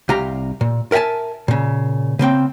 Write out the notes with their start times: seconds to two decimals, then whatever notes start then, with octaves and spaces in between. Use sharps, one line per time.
0.09 C2 G4 F5 A#5
0.61 A#2
0.92 A#4 E5 F#5 G#5 A5
1.48 A#2 C#3
2.19 C#3 A#3 C4 G5